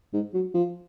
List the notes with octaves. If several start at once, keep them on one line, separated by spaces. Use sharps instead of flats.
G#2
F#3
F3